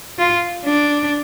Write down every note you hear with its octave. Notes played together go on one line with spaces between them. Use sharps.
F4
D4